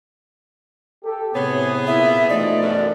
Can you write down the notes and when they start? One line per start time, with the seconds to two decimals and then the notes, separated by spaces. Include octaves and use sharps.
1.05 G4 A4
1.35 A2 C3 B3 G#4 C#5
1.87 A#2 A#3 E4 E5
2.29 B2 E3 F3 A3 D#4 D5
2.61 F#2